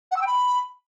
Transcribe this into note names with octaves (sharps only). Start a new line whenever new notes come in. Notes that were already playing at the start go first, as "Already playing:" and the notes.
F#5
E6
G5
B5